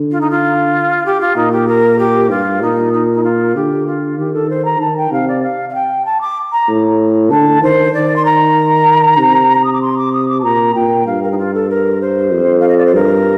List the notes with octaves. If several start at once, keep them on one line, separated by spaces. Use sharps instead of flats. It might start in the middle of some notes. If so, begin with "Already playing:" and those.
Already playing: D3
F4
D#4
F4
G4
F4
A#2 D#4
G4
A#4
G4
G2 F4
A#2 D#4
D#4
D#4
F4
D3 G4
F4
D#3 G4
A4
C5
A#5
D#3 A5
G5
C3 F5
D5
F5
F5
G5
A5
D6
A#5
A2
D3 A5
D#3 C5
D#3 D5
C6
A#5
C3
D#6
D6
C6
D6
D#6
D6
A5
A#2 A#5
A#2 G5
G2 F5
A#4
D#4
F4
A4
A#4
C5
F2
F5
D#5
D5
C5
G2 A#4